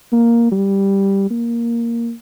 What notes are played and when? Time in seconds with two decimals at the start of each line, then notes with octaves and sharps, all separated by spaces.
0.12 A#3
0.51 G3
1.30 A#3